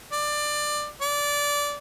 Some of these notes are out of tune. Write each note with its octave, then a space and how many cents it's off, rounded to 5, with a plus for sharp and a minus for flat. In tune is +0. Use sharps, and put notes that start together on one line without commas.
D5 +20
D5 -20